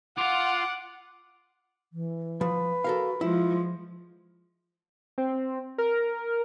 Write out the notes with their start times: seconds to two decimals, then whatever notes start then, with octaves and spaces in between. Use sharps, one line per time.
0.18 F4 F5 F#5 D6
1.93 E3
2.41 F3 B4
2.84 F#4 A4 A#4 F5
3.21 F3 G#3 E4 F4
5.18 C4
5.78 A#4